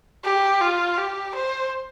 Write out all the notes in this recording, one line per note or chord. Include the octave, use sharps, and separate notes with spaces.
G4
F4
G4
C5